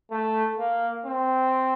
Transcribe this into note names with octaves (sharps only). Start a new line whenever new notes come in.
A3
A#3
C4